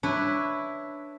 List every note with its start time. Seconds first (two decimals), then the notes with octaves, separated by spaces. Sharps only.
0.03 D4 E4 B4 C#5